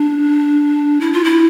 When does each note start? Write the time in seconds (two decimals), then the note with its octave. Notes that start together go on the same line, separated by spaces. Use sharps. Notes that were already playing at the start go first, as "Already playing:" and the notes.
Already playing: D4
1.01 E4
1.13 F4
1.24 E4